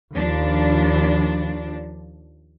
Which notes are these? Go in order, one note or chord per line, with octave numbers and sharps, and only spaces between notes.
D#2 F3 D4